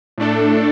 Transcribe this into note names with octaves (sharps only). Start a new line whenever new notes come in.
A2 A3 D4 A4